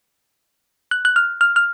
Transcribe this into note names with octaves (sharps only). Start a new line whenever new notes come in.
F#6
F#6
F6
F6
F6